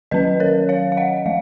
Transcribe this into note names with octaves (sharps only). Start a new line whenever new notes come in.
D#3 F#3 C#4 B4 D#5
A#4 C#5
C#5 F5
F5
D#5 F#5
F3 G#3 F5